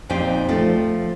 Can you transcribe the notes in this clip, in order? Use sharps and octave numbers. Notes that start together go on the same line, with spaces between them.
F2 A#2 C4 D#4 G4 C5
F3 A3